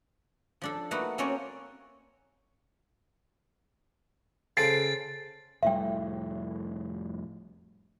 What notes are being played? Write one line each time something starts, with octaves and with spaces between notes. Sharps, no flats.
F3 D4 A4
A3 A#3 D#4 F#4 B4
A#3 C4 C#4 F#4 C#5 D5
C#3 A4 C5 A6 C7 D7
F1 A2 G3 E5 G5